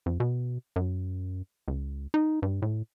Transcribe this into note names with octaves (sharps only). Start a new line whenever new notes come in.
F2
B2
F#2
C#2
D#4
G2
A2